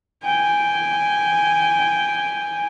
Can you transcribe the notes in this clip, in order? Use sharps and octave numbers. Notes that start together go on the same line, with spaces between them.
G5 G#5